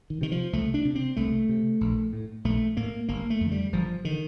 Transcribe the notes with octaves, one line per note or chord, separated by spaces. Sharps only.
D#3
C3 D#3
F3
C2 A3
D4
C3
C4
C2 A3
C3
A#1
A2
A#1 A3
A2 A#3
G1 A#3
A3
F2 D3
G3
G1 F3
D3 D#3